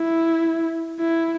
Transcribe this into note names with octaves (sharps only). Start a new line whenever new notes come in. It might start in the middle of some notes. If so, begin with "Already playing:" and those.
Already playing: E4
E4